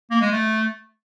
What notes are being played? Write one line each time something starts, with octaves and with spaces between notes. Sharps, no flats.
A#3
G#3
A3